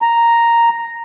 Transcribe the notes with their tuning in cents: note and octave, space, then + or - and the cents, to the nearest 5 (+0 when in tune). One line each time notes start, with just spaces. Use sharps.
A#5 +0